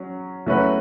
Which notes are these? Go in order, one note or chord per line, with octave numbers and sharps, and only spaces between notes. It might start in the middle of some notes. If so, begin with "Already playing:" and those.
Already playing: F#3 C#4
F#3 A3 C#4 F#4 B4